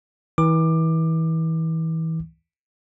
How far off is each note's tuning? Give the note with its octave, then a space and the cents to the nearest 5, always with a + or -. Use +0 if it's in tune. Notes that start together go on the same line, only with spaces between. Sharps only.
E3 -35 D6 +20